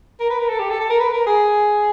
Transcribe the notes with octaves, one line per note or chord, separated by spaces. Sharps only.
A#4
B4
A#4
A4
G4
A4
A4
A#4
B4
A#4
G#4